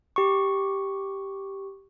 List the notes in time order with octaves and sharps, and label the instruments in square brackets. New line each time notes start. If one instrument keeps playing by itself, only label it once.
[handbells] G4 C#6